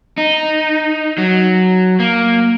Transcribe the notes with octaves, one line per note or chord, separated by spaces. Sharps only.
D#4
F#3
A#3